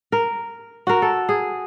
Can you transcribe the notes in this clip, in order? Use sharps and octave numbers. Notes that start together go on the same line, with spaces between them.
A#4
F#4 A#4
A4
G#4